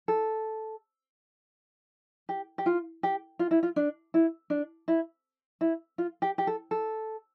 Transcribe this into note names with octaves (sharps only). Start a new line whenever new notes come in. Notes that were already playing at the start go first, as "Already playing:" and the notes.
A4
G4
G4
F4
G4
F4
E4
F4
D4
E4
D4
E4
E4
F4
G4
G4
A4
A4